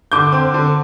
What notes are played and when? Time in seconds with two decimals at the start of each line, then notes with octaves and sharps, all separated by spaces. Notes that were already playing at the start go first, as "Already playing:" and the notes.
0.12 D3 D6 G6
0.32 C4
0.54 D3